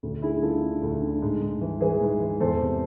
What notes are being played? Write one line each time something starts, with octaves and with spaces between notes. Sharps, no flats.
D2
D3 E4 G#4
D3 F4 A4
D3
D2
D3
G#2
G#2
E3
E3 G#4 B4
G#2
E3
E2 A4 C5
C3